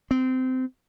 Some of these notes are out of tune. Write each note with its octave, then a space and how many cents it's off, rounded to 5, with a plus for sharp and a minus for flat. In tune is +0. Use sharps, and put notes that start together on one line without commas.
C4 -20